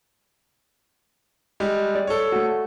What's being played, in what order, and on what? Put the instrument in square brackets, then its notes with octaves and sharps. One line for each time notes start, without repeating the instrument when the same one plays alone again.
[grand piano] G3 G#3
[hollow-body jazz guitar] D5
[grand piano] A4 C#5
[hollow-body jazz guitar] A3 F#4